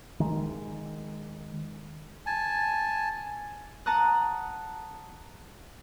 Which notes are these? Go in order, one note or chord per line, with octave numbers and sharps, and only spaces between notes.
D#3 G#3
G#5 A5
F#5 A5 A#5 D#6 F#6